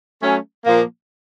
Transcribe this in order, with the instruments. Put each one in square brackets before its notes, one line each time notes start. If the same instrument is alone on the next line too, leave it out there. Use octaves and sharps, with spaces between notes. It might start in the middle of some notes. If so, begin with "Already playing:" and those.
[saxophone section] F#3 A3 C#4
A#2 F3 A#3